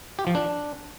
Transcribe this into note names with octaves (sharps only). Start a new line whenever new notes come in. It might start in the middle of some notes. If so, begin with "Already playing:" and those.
G4
F3
D4